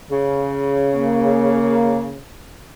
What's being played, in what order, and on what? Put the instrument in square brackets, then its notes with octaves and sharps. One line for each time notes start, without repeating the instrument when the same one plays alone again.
[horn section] C#3
[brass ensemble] A#3